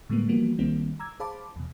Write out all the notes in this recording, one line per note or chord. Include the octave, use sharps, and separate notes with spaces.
A2 D3 G3 G#3 A#3 B3
E3 F3 G3 A#3 B3 F#4
B1 D#3 G3 A#3 C4 E4
A#5 D6 E6 G#6
G#4 C5 F5 A5 B5 D6
E2 B2